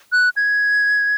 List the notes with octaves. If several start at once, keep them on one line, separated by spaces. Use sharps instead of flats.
F#6
G#6